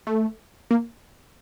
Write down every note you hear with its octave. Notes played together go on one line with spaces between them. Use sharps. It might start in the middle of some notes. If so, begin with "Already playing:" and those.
A3
A#3